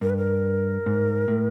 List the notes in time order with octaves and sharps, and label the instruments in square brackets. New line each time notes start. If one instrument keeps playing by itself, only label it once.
[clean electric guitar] G2 [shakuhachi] A#4
[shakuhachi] B4
A#4
[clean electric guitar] G#2
A2